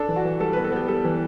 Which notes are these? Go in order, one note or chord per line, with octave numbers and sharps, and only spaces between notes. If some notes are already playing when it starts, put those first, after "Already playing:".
Already playing: D4 A4
E3
F#4
E3
G3 A4
B3 B4
A4
B3 G4
G3 A4
E3